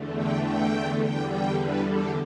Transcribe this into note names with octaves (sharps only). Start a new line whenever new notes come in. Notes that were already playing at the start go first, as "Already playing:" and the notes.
Already playing: E2 D3 A3
G5
G5
E2 D3 G3 G5
G5
B4
A4